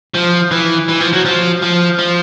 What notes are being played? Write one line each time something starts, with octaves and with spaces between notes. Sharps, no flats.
F3
E3
E3
F3
F#3
F3
F3
F3